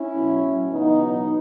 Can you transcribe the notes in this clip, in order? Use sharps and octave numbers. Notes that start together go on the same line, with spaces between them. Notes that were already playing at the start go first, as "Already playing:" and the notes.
Already playing: C#4 E4
B2 F#3
A2 F#3
C#3 E3 B3 D#4
B2 F#3